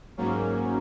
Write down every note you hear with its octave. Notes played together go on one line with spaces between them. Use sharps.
G#2 F#3 A#3 C#4